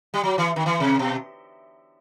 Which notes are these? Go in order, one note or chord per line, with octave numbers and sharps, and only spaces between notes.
G3
F#3
E3
D#3
E3
C3
B2